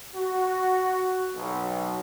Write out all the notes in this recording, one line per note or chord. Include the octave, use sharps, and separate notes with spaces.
F#4
B1